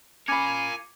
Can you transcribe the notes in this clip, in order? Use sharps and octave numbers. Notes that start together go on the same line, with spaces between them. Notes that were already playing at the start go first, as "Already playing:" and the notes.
C#4 F4 A#4 G#5 B5 D6 G#6 C#7